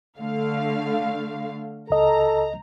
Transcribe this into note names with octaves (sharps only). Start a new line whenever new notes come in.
D3 A3 F5
C#2 A4 D#5 A#5